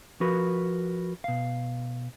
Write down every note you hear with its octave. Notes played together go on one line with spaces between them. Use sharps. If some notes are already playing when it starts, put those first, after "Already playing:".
F3 F#4 A#4 B4
B2 F5